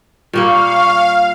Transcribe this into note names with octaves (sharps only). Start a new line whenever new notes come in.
A#2 G3 A#3 F5 C#6